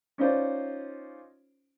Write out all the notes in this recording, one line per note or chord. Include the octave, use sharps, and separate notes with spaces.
C#4 D#4 F4 C5 D5